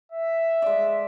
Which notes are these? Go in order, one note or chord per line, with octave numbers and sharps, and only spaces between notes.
E5
G#3 D5